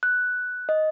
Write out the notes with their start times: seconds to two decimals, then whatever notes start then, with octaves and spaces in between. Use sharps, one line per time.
0.03 F#6
0.69 D#5